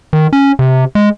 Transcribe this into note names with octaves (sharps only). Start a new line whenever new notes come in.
D#3
C#4
C3
G#3